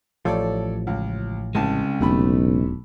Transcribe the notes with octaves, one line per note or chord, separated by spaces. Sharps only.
A1 A2 F3 A4 C#5 D5
C#2
C2 C#3 G#3 A5
E1 B1 C3 A3 B5